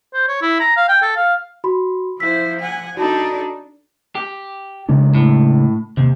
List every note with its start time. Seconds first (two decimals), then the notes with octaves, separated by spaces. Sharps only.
0.14 C5
0.28 C#5
0.41 E4
0.60 A#5
0.77 F5
0.88 G5
1.02 A4
1.16 F5
1.64 F#4 B5 C6
2.20 F3 E4 C5 E6 B6
2.60 F#5 G#5
2.97 D4 D#4 F#4 A4 A5 B5
4.15 G4
4.89 C#3 G#3 D4
5.14 A2
5.97 D#2 C3